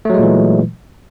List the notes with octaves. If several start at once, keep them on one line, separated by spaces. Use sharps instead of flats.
A#2 E3 F#3 G#3 A3